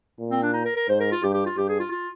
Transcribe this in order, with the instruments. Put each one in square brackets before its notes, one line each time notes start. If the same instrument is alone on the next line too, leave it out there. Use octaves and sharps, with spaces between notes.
[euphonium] A#2
[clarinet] C4
D4
D#4
A#4
A#4
[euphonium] G#2 [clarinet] C5
[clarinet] A#4
F4
[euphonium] G2 [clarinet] G4
[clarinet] G4
F4
[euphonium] G2 [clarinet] G4
[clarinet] G#4
F4
F4